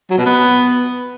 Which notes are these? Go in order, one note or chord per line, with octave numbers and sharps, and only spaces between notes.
F#3
B2
B3